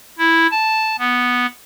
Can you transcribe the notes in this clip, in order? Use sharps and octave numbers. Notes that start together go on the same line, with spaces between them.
E4
A5
B3